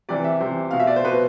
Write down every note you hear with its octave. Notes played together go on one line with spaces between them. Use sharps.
C3 E3 D5
E5
C3 E3 C5
B2 F5
E5
D5
C5
B2 B4